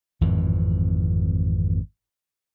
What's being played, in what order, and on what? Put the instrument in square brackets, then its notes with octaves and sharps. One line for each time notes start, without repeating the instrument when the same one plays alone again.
[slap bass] G#1 F2 A2 E3